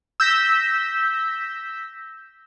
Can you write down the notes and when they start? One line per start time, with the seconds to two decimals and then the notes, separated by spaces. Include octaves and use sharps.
0.20 E6 G6 A#6 B6